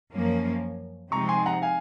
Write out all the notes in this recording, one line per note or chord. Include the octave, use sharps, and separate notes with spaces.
F#2 F3 A#3 C#4
C3 F3 G#3 C4 D#4 A#5 C#6
G#5 C6
F#5 A#5
F5 G#5